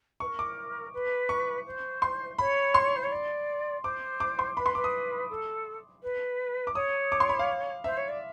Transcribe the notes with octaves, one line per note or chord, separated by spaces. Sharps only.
A#4 B4 C#6
D6
B4
C#6
C5
C6
C#5 B5
C6
C5
C#5
D5
C5 D6
D6
C6
B4 B5
C6
B4 D6
D#6
A4
B4
D6
C#5 D#6
D6
C6
B5
F5
C5 E5
C#5
D5